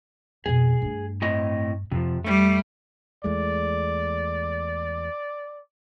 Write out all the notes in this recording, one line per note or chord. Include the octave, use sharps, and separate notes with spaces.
F2 B2 G#4
G2 A3
A2 C4 D#5
F2 C3 F3
G3 A3
E2 G#3 A3 D5